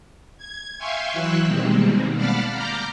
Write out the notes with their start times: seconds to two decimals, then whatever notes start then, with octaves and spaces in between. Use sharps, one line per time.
0.38 G#6
0.78 E5 F5 G5 G#5 C6 C#6
1.13 E3 F#3 E4 E6 F#6
1.47 B2 D#3 G3 G#3 A#3 C4
2.16 D5 F5 F#5 A5 B5 F6
2.51 A#5 D6 F6 G6